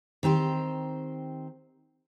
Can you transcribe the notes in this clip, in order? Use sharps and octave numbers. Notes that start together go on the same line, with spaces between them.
D#3 C4 G4 C5